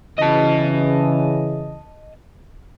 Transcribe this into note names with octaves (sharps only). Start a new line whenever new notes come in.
C#3 E3 D#5 A5